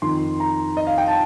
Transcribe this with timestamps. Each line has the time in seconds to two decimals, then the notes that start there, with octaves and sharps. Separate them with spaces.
0.02 F2 D#3 C6
0.40 A#5
0.77 D#5
0.87 F5
0.98 G5
1.08 A5